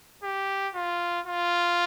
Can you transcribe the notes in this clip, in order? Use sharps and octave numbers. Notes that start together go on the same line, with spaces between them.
G4
F4
F4